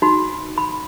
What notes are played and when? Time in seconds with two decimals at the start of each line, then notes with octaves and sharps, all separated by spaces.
0.02 D#4 F#4 B5
0.58 B5